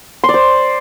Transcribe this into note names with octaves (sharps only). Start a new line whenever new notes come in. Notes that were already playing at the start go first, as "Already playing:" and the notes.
C6
D5
C5